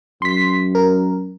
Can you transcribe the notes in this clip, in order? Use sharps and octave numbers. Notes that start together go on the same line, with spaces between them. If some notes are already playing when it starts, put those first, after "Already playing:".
F#2 C6 B6
A#4